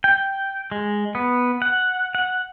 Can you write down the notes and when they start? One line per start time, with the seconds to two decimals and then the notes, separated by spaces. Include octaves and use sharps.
0.04 G5
0.72 G#3
1.15 B3
1.62 F#5
2.15 F#5